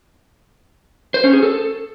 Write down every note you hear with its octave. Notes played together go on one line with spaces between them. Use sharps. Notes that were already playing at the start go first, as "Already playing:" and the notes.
C5
C#4
G#4
A4